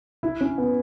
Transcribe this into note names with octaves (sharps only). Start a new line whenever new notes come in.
E4
C#4
B3